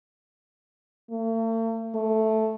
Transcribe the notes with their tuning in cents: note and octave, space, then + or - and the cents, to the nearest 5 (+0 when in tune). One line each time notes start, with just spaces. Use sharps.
A3 +45
A3 -5